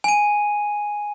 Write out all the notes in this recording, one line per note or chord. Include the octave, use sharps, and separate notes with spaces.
G#5 D#7